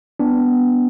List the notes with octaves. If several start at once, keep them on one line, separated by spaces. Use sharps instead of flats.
B3 D4